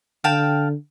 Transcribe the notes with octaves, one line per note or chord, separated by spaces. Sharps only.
D3 F5 G5 A5